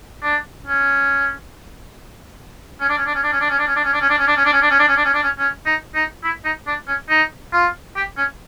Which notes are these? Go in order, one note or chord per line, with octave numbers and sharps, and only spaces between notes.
D4
C#4
C#4
D4
C#4
D4
C#4
D4
C#4
D4
C#4
D4
C#4
D4
C#4
D4
C#4
D4
C#4
D4
C#4
D4
C#4
D4
C#4
D4
C#4
D4
C#4
D4
C#4
C#4
D#4
D#4
E4
D#4
D4
C#4
D#4
F4
G4
C#4